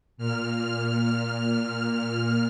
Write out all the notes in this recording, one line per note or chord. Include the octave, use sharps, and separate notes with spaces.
A#2 F6